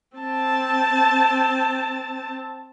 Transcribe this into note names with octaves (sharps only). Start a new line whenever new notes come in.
C4 A5